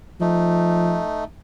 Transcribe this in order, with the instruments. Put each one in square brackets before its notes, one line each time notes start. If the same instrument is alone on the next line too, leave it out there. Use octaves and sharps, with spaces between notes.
[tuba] F3 [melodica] A3 D#4